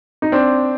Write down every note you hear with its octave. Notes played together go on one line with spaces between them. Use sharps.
D#4
C4 D4